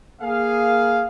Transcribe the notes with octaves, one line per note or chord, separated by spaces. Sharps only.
A#3 G#4 F5